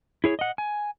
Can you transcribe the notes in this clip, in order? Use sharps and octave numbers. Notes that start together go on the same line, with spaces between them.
E4 G#4 C#5
D#5 F#5
G#5